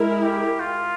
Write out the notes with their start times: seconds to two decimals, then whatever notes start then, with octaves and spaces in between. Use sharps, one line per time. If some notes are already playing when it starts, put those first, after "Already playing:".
Already playing: G#3 E4 A#4
0.22 G4
0.60 F4